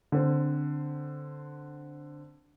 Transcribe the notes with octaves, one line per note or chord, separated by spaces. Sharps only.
D3 C4